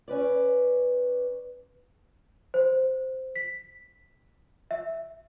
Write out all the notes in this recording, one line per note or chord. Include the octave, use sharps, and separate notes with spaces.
C#4 B4 D5
C5
B6
E5